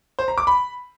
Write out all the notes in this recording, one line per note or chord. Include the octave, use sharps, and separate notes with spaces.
C5
A#5
D6
B5